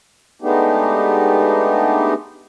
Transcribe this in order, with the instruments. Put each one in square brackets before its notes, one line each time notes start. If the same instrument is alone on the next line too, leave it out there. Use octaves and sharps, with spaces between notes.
[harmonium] G#3 A3 B3 D4 D#4 G4